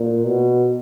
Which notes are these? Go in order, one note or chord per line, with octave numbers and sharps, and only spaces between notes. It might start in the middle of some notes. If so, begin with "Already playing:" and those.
Already playing: A#2
B2